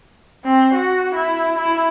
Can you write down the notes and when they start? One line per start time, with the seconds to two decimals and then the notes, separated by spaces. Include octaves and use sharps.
0.44 C4
0.74 F#4
1.15 E4
1.58 E4